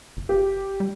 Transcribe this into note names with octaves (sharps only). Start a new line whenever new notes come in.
F#1
G4
G3